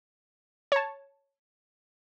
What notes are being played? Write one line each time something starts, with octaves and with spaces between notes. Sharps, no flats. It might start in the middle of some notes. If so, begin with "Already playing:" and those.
C#5 A5